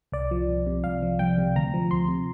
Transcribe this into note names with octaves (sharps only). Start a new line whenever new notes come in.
C2 D5
F3
C2
C3
C2 F5
F3
C2 G5
C3
D2 A#5
F3
D2 C6
C3